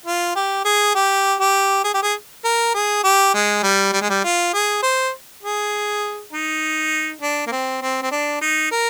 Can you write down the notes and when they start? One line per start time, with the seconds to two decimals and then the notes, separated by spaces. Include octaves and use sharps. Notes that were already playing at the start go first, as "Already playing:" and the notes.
0.06 F4
0.36 G4
0.65 G#4
0.95 G4
1.40 G4
1.84 G#4
1.94 G4
2.03 G#4
2.45 A#4
2.74 G#4
3.03 G4
3.34 G#3
3.63 G3
3.93 G3
4.01 G#3
4.10 G3
4.24 F4
4.54 G#4
4.83 C5
5.43 G#4
6.33 D#4
7.21 D4
7.47 A#3
7.52 C4
7.82 C4
8.02 C4
8.11 D4
8.41 D#4
8.71 A#4